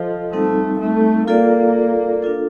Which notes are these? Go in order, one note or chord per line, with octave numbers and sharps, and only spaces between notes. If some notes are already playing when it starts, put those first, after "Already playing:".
Already playing: F3 F4 A4 D#5
G3 A3 C4 D#4 A4
A3
A#3 F4 A4 D5
D4 F4 A4